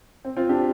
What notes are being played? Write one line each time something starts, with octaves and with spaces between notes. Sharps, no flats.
C4
C4 F4
D4 G4